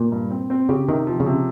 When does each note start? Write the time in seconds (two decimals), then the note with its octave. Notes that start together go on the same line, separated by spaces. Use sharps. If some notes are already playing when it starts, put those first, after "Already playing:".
Already playing: A#2
0.12 G2
0.30 C4
0.50 C4
0.69 C#3 G4
0.88 C3 D#3
1.07 F3
1.20 C#3
1.26 C3